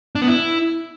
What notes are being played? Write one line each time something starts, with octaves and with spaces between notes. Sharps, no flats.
D4
B3
E4